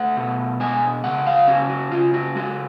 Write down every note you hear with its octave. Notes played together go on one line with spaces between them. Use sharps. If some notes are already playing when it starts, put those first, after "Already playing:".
Already playing: A3 F#5
B2
G#3 G#5
C#3 F#5
F5
C#4 F#4
F#4
C#3 F4
F#4
G#3 F#4